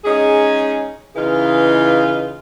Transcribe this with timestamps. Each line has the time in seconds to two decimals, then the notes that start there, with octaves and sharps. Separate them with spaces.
0.05 G#3 C#4 D#4 G#4
1.16 C#3 E3 D#4 F4 G#4 B4